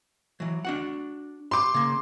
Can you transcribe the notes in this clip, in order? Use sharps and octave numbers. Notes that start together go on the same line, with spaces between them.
E3 F#3
D4 F#4 F#5
C6 D6
C#3 A#3